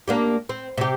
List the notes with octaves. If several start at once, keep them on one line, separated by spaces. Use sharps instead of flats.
A#3 D4 G4
C4
C3 G4